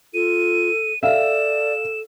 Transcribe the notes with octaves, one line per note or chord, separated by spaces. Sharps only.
F4 A4 D#7
A4 D5 E5 F5 E7